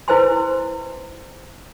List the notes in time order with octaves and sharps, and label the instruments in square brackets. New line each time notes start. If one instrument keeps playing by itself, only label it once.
[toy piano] E4 B4 C5 E5 G#5 C6